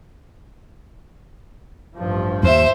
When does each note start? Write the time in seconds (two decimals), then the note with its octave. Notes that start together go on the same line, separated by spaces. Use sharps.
1.95 A1 G2 F3
2.43 D#2 C5 E5